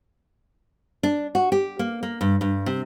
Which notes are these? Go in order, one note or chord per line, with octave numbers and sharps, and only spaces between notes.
D4
F#4
G4
A#3
A#3
G2
G2
C3